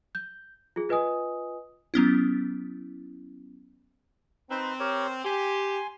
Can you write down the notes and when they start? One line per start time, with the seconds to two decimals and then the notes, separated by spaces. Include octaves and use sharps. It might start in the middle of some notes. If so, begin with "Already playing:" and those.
0.15 G6
0.76 F4 G#4
0.89 F4 B4 D#5 G#5 D#6
1.94 F#3 B3 C#4 E4
4.50 C4 D#4 B4
4.80 G4 A#4 C#5
5.25 G4 G#5 C6